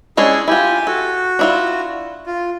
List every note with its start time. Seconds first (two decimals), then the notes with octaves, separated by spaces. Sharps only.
0.17 G#3 C#4 D4 E4 G#4
0.48 E4 F4 G4 G#5
0.87 F#4 A4
1.39 D4 E4 F4
2.26 F4